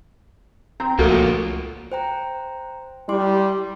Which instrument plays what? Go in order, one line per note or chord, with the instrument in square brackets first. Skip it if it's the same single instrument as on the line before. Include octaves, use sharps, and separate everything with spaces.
[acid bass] C4 [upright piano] A#5
[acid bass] C#2 [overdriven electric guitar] F3 A#3 [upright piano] A3 F#4
[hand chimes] C5 G5 A#5
[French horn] G3 [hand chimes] E4 C6 D6